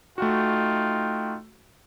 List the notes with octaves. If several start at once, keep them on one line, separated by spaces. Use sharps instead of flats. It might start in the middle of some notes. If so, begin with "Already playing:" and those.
A3 D#4 F4 F#4 G5